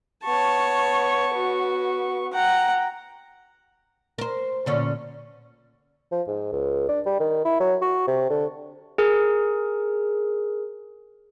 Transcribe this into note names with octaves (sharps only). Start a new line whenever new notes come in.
B3 C#5 A5 C#6
F#4
F#5 G5 A#5
A#4 C5
A#2 D3 C#4
F3
G#2
C#2
D4
G3
D#3
E4
F#3
F#4
C3
D3
G#4 A#4